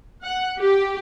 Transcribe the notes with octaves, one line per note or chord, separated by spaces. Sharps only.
F#5
G4